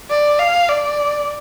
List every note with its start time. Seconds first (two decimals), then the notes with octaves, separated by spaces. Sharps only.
0.10 D5
0.39 F5
0.68 D5